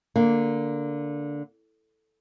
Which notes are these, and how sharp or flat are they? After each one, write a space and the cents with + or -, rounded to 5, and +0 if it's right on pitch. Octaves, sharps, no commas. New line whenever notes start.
D3 -10 A#3 -5